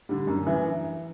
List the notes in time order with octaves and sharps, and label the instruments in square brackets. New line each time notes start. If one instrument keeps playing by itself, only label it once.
[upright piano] D3 G3
F#2
E3